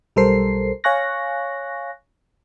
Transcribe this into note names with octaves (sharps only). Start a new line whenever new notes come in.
B1 G3 A4 A#4 C5 C7
C#5 F5 G#5 C#6 F#6 A#6